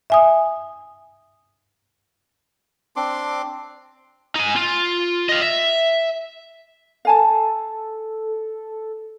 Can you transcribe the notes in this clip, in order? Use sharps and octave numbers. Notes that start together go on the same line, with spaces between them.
E5 G#5 D#6
C4 D4 C6 D6
D#4 G#5
F4
D#5 F5
E5
A4 F5 G#5 A5